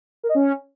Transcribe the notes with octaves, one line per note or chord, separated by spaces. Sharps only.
A#4
D#5
C#4